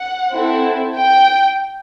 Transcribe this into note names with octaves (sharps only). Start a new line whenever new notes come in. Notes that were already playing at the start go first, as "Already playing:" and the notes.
Already playing: F#5
C4 E4 A4
G5